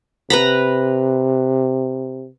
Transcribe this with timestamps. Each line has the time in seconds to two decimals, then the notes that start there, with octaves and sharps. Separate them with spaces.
0.30 C3 B4 A#5 B5